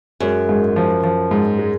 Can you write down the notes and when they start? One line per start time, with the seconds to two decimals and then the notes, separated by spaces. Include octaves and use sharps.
0.20 F#2 G#3
0.49 G#2
0.76 F3
1.04 F3
1.31 G#2
1.59 G#3